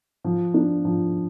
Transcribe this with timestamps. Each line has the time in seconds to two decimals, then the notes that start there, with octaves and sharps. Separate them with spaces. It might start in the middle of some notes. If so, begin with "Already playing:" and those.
0.24 F3
0.54 D4
0.85 F3